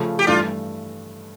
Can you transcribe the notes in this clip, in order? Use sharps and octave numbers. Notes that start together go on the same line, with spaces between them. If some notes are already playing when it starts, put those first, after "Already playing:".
Already playing: C#3 F3 A3
G4
G2 E3 A3 D4 F4